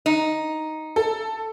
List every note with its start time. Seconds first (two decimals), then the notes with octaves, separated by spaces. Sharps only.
0.06 D#4
0.96 A4